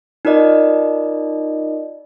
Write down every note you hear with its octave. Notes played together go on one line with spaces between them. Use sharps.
D#4 F4 A#4 D5 D#5